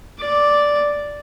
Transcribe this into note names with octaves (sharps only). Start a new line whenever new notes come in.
D5